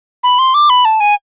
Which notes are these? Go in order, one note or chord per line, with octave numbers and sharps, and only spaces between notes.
B5
C6
D6
B5
A5
G#5